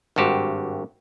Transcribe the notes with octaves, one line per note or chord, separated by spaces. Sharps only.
G#1 G2 F#4 G4 C5